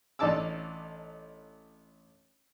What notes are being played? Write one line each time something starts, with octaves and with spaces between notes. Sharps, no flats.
A1 D4 D#4 A5 D6 E6